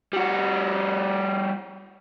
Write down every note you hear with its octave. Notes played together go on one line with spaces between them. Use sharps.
G3 F#4